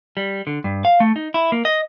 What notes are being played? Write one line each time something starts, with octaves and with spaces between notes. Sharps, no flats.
G3
D3
G2
F5
A3
D#4
E4
A#3
D#5